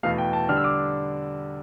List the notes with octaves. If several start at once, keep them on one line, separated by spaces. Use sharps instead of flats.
E2 B2 A3 F5
G5
A5
D3 G3 D4 F6
E6
D6